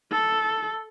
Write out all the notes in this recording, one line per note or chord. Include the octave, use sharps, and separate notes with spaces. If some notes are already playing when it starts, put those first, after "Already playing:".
A4